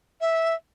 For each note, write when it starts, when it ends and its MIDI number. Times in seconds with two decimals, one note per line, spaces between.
0.20 0.54 76